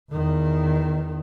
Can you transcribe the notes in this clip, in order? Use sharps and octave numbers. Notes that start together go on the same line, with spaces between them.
E2 D#3